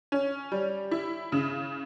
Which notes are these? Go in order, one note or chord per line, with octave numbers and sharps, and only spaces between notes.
C#4
G3
E4
C#3